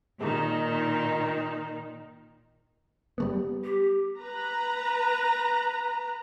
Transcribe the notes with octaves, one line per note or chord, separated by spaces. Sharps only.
A#2 D#3 D#4
G3 A3 B3
G4
B4 A#5